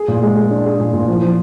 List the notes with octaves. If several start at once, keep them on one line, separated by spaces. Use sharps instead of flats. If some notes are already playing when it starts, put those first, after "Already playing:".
Already playing: G#4
A#2
G#3
G#3
D4
G#4
A#2
A#2
F3
F3